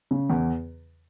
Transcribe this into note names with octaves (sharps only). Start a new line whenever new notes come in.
C#3
E2